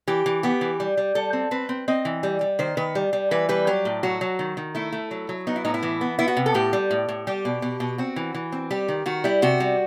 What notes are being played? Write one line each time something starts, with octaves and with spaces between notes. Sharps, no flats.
E3 G4
E3
B3 G4
E3
G3
G3
G3 A4
C4
C4 B4
C4
C4 D#5
E3
G3
G3
D#3 C5
D#3 B4
G3
G3
E3 B4
G3 B4
F#3 G4
A2
F#3 F#4
F#3
D#3
D#3
A3 E4
A3
F#3
F#3
B3 D#4
E4
A2 D#4
E4
E3
B3
B3 E4
F#4
C3
A4
A2 G4
G3
A2
A2
G3 G4
B2
B2
B2
C4 F#4
E3
E3
C4
G3 G4
D#3
D#3 F#4
G3 E4
C3 F#4
G3